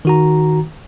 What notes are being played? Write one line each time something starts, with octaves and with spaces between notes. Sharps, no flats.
D#3 F#4 A#5